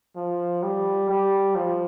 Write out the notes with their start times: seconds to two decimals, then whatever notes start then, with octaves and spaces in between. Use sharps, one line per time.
0.16 F3
0.63 G3
1.09 G3
1.55 F3